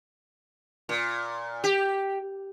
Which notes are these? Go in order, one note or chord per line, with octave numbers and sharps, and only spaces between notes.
A#2
G4